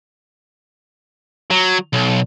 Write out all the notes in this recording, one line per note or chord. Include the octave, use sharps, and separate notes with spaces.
F#3
B1